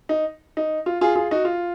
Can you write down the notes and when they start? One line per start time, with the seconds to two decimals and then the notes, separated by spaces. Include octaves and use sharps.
0.09 D#4
0.57 D#4
0.86 F4
1.01 F4 G#4
1.15 F4 G#4
1.31 D#4 F#4
1.45 F4